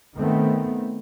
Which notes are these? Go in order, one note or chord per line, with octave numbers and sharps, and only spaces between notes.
D#3 A3 B3 C4